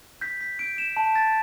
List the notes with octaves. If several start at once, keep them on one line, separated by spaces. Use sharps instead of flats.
G6 B6
B6
G6 D7
E7
A5
A6